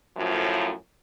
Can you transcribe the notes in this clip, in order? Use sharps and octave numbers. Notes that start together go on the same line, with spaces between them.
F#2 A2 F3